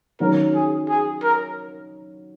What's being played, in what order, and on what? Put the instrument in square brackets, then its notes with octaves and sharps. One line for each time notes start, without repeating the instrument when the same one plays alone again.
[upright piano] D#3 F#3 C#4 [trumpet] A#4
[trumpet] G#4
G#4
A#4